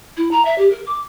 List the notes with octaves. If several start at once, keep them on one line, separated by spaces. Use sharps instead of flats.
E4
A#5
E5
G4
A#4
D6